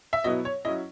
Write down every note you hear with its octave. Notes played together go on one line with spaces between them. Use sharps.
E5
B2 F#3 B3 E4 D#5
C#5
F#3 C#4 E4 D#5